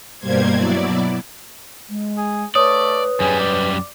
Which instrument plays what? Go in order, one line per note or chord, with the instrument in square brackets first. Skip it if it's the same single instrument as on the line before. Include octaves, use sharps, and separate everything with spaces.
[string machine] G2 B2 G3 A#3 C5 G#6
B2 F#3 E4 D5
[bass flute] G#3
[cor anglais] G#4
[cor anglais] A3 [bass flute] B4 [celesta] C#5 D#6 [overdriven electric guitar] D5
[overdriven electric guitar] F#2 G3 [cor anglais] G#4
[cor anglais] D5